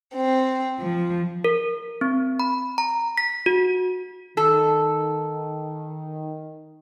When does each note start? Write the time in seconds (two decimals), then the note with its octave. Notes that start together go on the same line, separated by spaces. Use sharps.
0.14 C4
0.79 F3
1.44 A#4
2.01 C4
2.40 B5
2.78 A#5
3.17 B6
3.46 F#4
4.37 D#3 A4